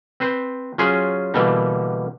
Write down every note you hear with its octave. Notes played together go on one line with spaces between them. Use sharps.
C4 B4 C5
F#3 C#4 F4 G#4 C5
B2 D3 E3 G3 A#3